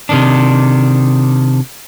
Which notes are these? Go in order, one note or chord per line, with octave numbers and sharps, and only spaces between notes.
C3 D#3 D4